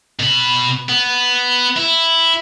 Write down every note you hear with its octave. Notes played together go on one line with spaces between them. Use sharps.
B2 B5
B3
E4